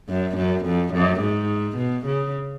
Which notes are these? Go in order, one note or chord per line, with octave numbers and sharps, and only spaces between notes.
F#2
F#2
F2
F#2
G#2
B2
C#3